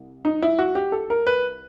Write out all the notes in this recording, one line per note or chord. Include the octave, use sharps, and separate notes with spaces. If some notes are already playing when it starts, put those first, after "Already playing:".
Already playing: C2
D#4
E4
F#4
G4
A4
A#4
B4